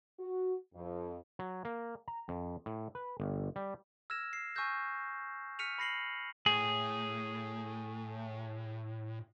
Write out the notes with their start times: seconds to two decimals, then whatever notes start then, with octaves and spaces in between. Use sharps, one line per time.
0.19 F#4
0.75 F2
1.39 F#3
1.65 A#3
2.08 A#5
2.29 F2
2.66 A2
2.95 B4
3.20 G1
3.56 G3
4.10 E6 F6 G#6 A#6 E7
4.33 C7
4.55 G#5 C#6 E6 F6 G6 A#6
5.59 F6 B6 C#7 D#7 F7
5.78 B5 A#6 C7 F#7
6.46 A2 G#4